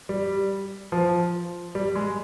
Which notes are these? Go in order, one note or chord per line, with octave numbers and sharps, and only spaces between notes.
G3
F3
G3
G#3